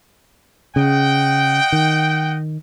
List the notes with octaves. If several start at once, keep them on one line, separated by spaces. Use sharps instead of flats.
C#3 D#5 F#5 G5
D#3